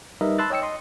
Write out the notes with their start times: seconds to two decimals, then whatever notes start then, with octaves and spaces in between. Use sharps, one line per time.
0.21 G3 D#4 A#4 B4 D#5 E5
0.38 A5 B5 C6 E6 F#6 A6
0.50 C#5 D#5 G5 E6 C#7
0.62 D#5 C6 D#6